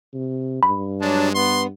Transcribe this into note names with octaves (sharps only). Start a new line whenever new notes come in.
C3
G2 B5
F#3 G#3 D4 A5
B3 C6